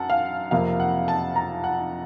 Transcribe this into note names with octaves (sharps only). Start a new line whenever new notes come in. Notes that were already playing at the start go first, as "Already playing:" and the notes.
Already playing: F#2 F#5 A5
F5
F2 C3 F3 A#3 F5
F#5
A5
A#5
F#5